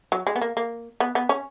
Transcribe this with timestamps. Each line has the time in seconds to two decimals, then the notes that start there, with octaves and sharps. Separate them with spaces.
0.12 F#3
0.27 G#3
0.36 B3
0.41 A#3
0.57 A#3
1.00 B3
1.15 B3
1.29 C#4